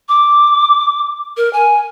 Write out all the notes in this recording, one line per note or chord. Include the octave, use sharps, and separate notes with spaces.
D6
A#4
G#5